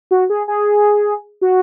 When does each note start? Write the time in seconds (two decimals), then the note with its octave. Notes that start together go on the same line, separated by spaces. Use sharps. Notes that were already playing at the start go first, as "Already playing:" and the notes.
0.11 F#4
0.30 G#4
0.48 G#4
1.41 F#4